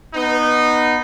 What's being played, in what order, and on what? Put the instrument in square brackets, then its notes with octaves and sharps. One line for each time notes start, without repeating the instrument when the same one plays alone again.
[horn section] B3 D#4